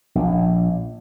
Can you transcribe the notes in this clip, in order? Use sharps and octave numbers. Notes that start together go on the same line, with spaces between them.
A#1